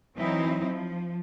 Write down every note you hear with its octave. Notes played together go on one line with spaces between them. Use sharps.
E3 F#3 C4 D#4 E4
F3